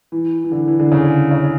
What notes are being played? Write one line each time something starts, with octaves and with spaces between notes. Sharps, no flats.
E3
E3
D3
E3
D3
C#3
C#3